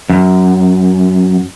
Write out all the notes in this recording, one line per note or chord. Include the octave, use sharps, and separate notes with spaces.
F#2